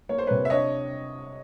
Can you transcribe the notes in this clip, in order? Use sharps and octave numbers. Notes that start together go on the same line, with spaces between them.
A#3 C#5
C5
C3 B4 C#5
E5
D4 C#5 D#5